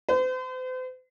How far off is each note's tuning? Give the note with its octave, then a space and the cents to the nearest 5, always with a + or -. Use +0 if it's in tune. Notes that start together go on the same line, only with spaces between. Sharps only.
C5 -40